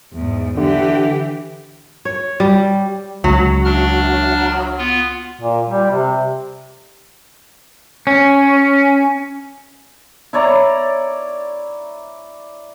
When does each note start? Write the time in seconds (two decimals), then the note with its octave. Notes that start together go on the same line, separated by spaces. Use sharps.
0.13 E2 G#2
0.57 D3 E3 G4
2.05 C#5
2.40 G3
3.24 C#2 F#3 G#3
3.65 D4 F6
4.78 B3 F4
5.41 A#2
5.70 G3
5.91 C3
8.07 C#4
10.33 E4 C#5 D5 A#5